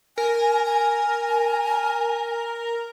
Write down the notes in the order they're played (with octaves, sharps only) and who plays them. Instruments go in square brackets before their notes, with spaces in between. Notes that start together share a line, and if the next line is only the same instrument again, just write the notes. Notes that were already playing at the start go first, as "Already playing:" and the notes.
[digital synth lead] A#4 [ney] G#5
[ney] G#5